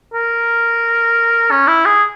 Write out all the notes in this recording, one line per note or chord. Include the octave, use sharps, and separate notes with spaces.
A#4
C#4
E4
G#4